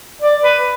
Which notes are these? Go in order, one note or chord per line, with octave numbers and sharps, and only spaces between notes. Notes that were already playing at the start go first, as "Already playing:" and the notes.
D5
B4